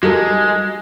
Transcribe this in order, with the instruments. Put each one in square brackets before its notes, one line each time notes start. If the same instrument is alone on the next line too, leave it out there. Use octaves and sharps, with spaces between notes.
[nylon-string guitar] G3 D#4 [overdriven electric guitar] G#3 [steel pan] F4 A4 A#4 [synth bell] F#4